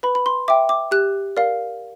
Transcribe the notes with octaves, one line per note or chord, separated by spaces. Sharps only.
B4 B5
B5
C6
E5 G5 D6
D6
G4 F#6
A#4 D5 F5